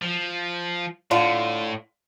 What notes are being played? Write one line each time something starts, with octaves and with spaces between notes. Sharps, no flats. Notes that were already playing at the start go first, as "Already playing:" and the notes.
F3
A2 D3 F4